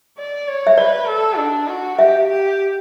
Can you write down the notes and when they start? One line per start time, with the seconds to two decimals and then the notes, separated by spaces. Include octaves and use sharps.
0.18 D5
0.48 C#5
0.67 E5
0.78 B4 D5
1.08 A4
1.38 D4
1.68 F#4
1.98 G4 E5
2.29 G4